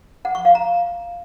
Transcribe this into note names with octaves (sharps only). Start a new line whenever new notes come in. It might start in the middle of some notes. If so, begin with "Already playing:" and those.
F#5
C#6
F5
A#5